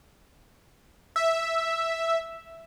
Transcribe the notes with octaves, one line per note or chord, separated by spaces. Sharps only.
E5